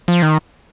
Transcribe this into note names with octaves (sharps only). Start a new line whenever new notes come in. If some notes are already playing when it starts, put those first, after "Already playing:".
F3
D#3